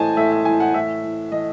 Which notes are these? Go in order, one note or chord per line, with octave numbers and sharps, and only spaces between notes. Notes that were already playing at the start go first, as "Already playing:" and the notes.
Already playing: A2 E3 C5 D#5 G#5 A5
A2 E5
E5
E3 G#5
F#5
A2 E5
E3
E3 D#5